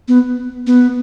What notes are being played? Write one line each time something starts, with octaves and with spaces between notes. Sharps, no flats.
B3
B3